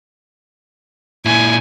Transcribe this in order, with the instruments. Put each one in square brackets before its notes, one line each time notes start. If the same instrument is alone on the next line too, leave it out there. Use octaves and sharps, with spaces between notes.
[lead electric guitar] A#2 E4 [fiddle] G#5